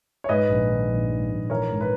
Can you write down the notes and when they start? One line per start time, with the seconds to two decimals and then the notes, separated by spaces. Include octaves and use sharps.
0.24 C#5
0.29 G#2 B4 D#5
0.49 A#1
0.69 D#3
0.90 A#1
1.10 G#2
1.31 A#1
1.50 E3 A#4 C#5
1.71 G#2
1.81 B4